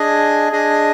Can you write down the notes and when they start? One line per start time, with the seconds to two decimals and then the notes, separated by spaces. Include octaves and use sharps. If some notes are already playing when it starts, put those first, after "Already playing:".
Already playing: D4 G#4 D#5 G#5
0.52 D4 G#4 D#5 G#5